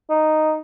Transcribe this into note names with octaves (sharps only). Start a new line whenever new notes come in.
D#4